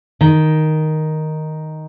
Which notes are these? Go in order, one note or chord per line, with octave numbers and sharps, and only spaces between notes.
D#3